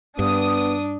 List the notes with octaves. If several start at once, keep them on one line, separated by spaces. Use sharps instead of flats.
G2 B3 D4 D#6